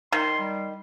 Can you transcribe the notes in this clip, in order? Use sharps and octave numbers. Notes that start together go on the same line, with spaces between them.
D#3 C6
G3